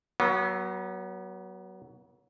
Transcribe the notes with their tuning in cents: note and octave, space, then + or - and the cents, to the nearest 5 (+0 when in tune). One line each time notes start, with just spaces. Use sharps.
F#3 +20 B3 -30